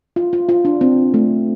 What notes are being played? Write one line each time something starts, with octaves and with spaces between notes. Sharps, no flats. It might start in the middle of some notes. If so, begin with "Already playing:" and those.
F4
F4
F4
D4
C4
A3